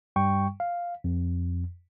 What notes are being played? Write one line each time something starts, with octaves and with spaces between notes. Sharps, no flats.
G2 G3 G5 C#6
F5
F2